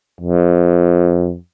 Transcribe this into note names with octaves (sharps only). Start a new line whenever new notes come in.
F2